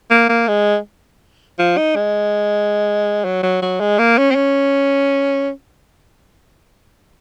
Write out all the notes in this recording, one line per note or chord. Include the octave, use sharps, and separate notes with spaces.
A#3
A#3
G#3
F3
D#4
G#3
F#3
F#3
F#3
G#3
A#3
C#4
C4
C#4